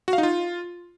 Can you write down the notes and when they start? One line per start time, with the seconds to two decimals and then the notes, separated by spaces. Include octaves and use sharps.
0.08 F#4
0.13 F5
0.18 D#4
0.23 F4